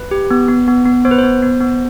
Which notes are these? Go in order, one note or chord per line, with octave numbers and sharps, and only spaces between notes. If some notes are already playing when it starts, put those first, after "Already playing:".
Already playing: B4
G4
B3
B3
B3
B3
B3 C5
B4
C5
B3
B3
B3